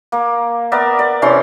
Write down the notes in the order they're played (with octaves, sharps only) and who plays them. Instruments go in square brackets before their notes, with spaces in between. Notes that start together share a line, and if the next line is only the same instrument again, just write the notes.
[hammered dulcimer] A#3
B3 A#4 D5 E5
D5
C3 E3 C#4 C6